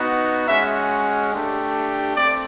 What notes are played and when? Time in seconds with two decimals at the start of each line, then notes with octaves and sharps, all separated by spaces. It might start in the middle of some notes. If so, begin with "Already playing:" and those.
Already playing: B3 D#4 F#4
0.48 G#3 C#4 F#4 E5
1.32 A3 D4 G4
2.16 A3 C4 D5